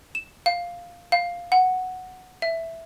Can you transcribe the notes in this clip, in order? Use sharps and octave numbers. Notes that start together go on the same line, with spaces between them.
E7
F5
F5
F#5
E5